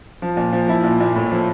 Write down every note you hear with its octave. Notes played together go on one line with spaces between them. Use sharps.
F3
A#2
F3
F3 E4
A#2
A#2
A2
F3